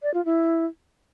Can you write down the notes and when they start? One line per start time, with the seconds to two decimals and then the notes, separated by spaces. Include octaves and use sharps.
0.02 D5
0.14 F4
0.25 E4